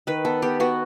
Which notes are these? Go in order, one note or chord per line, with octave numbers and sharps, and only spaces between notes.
D#3 B4
B3 A4
B3 G4
B3 F#4